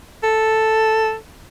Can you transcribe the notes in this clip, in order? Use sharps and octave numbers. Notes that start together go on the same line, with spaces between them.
A4